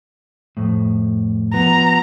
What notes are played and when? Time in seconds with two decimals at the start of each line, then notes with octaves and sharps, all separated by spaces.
0.57 F2 A2
1.53 F3 B3 A#5